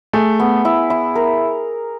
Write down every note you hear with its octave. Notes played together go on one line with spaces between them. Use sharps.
A3 G#4
B3
E4
E4
A#4